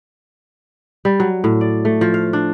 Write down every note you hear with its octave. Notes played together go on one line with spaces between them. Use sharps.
G3
F#3
A2
D5
A3
F3
F5
D4